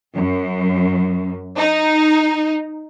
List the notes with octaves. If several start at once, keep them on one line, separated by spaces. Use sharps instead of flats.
F#2
D#4